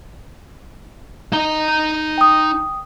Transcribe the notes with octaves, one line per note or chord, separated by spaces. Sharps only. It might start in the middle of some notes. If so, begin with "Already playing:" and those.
D#4 A#5 G7
G5 D#6